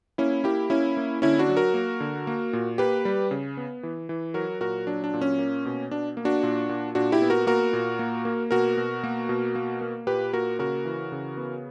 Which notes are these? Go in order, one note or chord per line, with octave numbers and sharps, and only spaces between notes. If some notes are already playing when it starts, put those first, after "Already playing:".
A#3 C#4 E4
A#3 E4 G4
A#3 C#4 E4
A#3
D3 C#4 E4
D4 F#4
F#3
F#4 A#4
A#3
D3
A#3
A#2
A#3 G4 B4
G3
C#3
B3
E3
E3
F#3 F#4 A#4
A#2 F#4 A#4
F#3 D4
D4
A#2
C#4
A#3
B2
B2 D4
A#3
D4 F#4
A#2
A#2
A#2 D4 F#4
E4 G4
B3
F#4 A#4
A#3 F#4 A#4
A#2
A#3
A#3
B2 F#4 A#4
B2
A#3
B2
A#3
A#3
A#2 G4 B4
A#3 F#4 A#4
C#3 F#4 A#4
E3
C#3
B3